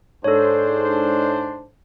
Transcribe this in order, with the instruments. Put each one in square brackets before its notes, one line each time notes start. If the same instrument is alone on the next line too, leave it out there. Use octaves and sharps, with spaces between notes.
[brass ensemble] G#2 D4 C5 [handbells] A4 C#5